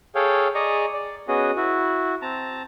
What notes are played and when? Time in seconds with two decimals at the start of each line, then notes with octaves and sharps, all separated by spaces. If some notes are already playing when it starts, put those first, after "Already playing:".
0.15 G#4 A4 C#5 F5 G5
0.55 G#4 D5 D#5 A#5 C#6
0.93 D5
1.28 B3 C#4 F#4 G#4 D#5
1.56 E4 F#4
2.22 C4 A5 A#5